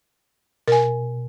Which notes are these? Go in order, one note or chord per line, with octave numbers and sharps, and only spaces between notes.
B2 A#4 G#5